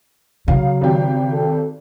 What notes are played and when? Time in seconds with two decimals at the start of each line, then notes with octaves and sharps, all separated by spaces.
0.48 C#3 F#3 F5
0.81 G#1 G4
1.33 A4